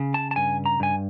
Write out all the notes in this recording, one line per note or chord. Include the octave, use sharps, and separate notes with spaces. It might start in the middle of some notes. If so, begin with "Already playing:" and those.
Already playing: C#3
A5
A5
G2 G#5
A#5
G2 G#5